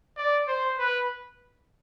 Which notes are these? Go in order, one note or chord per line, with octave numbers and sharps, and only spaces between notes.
D5
C5
B4